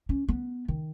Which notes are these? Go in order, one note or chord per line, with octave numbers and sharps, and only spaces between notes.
C#4
B3
D#3